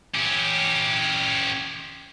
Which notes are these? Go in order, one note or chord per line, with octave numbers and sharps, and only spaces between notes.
C#4 G4